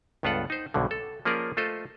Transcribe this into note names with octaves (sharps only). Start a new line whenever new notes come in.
C#2 G2 B3 F4 A4 F#5
D#4 C5
B1 G2 B2 D3
A4
F3 A#3 C#4 G#4 A#4 D5
A3 F4 A4 C5 D#5